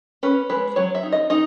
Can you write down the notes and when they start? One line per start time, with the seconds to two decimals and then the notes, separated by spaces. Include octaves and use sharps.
0.23 C#4 B4
0.50 G#3 B4
0.76 F#3 C#5
0.95 E5
1.03 D#4
1.12 D#5
1.30 D#4 D#5